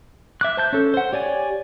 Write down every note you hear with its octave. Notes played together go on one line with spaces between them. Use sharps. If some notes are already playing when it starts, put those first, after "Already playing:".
E5 D6 F#6
C5 A5 G6
C#4 A4
C5 F#5
G4 C#5 D5 G#5